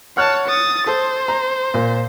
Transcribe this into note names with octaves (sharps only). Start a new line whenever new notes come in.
C#5 F#5 A5 F6 F#6
D#6 A6
A4 C5
A#5
A#2